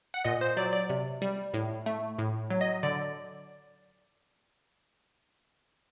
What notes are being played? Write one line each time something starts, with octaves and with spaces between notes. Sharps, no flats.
F#5
A#2 D#5
C5
F#3 D5
D5
C3
G3
A2
A3
A2
F#3
D#5
D3 D5